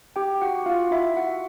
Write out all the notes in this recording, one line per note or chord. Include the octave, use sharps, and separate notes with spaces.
G4 G5
F#4 F#5
F4 F5
E4 E5
F#4 F#5